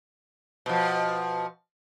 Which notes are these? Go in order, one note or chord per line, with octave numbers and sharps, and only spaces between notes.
B2 F3